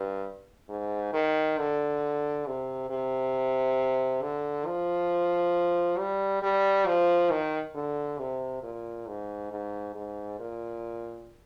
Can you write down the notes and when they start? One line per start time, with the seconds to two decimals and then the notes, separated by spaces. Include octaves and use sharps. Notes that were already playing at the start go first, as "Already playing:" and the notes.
Already playing: G2
0.69 G#2
1.13 D#3
1.58 D3
2.46 C3
2.90 C3
4.22 D3
4.66 F3
5.99 G3
6.42 G3
6.87 F3
7.31 D#3
7.75 D3
8.19 C3
8.63 A#2
9.07 G#2
9.51 G#2
9.95 G#2
10.40 A#2